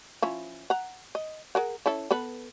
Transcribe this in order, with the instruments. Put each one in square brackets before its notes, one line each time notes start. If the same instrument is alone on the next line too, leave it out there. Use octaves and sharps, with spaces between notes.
[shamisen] F3 C#4 E4
F#5 A#5
D#5
G#4 A#4 F#5
C#4 E4 A4
B3 A4 B4